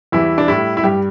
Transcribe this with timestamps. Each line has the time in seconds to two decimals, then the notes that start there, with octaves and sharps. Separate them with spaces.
0.12 E2 E3 G3 E4
0.38 D4
0.47 A2 G3 E4
0.77 E4
0.84 G2 G3 G4